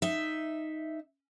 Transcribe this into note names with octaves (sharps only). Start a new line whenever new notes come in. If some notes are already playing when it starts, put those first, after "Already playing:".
D#4 E5